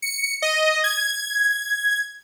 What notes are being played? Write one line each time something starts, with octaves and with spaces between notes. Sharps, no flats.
C#7
D#5
G#6